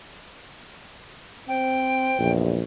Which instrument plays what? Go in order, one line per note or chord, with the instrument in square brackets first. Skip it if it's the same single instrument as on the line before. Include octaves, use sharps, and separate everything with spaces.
[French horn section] C4 C5 [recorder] G5
[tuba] A#1 [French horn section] E2